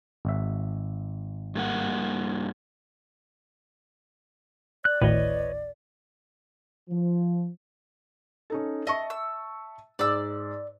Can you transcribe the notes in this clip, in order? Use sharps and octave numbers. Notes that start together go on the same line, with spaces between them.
G#1 E5
G2 A#3 F#5
D5 F#6
G#1 D2 A2 B4 C#5 D#5
F3
C#4 D#4 A4
D#5 E5 A5 C#6
E6
G#2 D5 E6